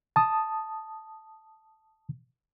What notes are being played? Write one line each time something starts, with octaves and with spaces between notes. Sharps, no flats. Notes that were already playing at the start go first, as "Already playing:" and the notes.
A5 D#6